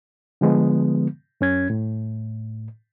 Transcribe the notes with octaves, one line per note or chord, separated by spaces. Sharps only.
D3 F3 G#3 B3
F#2 C#4 G#6
A2